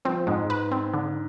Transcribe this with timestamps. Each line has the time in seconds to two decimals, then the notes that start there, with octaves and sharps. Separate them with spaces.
0.05 F3 C4
0.27 G#2 G#3
0.50 B4
0.72 C4
0.93 D3